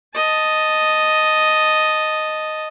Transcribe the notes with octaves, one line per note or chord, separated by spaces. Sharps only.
D#5 A5